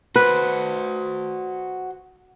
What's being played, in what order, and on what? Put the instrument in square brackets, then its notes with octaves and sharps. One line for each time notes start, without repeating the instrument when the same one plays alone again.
[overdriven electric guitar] F#4 C5 [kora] B4